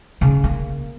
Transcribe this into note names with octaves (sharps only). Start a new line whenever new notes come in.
C#3
A#3